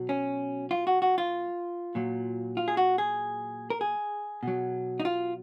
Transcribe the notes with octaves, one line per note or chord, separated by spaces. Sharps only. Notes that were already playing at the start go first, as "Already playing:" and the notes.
Already playing: B2 F#3
C#4
F4
F#4
F#4
F4
A#2 F#3
F4
G#4
F#4
G#4
A#4
G#4
B2 F#3
D#4
F4